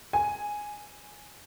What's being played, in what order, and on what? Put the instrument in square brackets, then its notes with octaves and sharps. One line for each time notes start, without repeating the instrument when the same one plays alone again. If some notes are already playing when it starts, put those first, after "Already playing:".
[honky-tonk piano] G#5